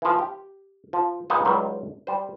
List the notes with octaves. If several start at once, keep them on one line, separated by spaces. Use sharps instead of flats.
E3 F3
G4
F3
A#3 D#4 F4 G4 G#4 B4
C#2 D#3 F#3 G3 B4 C5
G3 C5